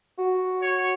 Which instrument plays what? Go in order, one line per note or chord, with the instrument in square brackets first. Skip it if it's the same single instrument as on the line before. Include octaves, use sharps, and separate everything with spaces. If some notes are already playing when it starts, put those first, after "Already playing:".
[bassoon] F#4
[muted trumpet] C#5